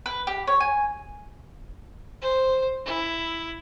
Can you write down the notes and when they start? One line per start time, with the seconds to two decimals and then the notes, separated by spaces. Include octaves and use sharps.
0.06 B4
0.27 G4
0.47 C#5
0.60 G#5
2.22 C5
2.85 E4